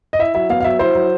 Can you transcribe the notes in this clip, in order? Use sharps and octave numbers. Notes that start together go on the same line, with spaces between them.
D#5
E4 E5
F#3 E5
B3 F5
F5
F#3 E5
E4 C5
F#3